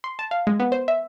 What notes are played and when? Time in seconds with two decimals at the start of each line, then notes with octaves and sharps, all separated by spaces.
0.04 C6
0.19 A5
0.31 F5
0.47 G#3
0.60 B3
0.72 C5
0.88 E5